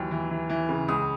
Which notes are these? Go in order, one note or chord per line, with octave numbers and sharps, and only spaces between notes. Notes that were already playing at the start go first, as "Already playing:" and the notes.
Already playing: D#2 E3 F#3
E3
E3
E3
C#3
C#2 D#6